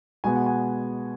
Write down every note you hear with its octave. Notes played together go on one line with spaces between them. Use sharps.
B2 G#3 B3 G#5
F#5
G#5